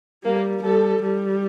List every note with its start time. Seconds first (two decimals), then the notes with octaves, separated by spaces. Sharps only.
0.25 G3 A#3
0.63 G3 A4
1.03 G3